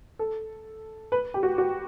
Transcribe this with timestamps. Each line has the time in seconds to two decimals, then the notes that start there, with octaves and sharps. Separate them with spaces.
0.19 A4
1.12 B4
1.34 G4
1.43 F#4
1.58 F#4